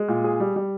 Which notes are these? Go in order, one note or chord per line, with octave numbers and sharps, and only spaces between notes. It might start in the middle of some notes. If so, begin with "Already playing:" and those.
Already playing: G#3
A#2
G#4
G3
G3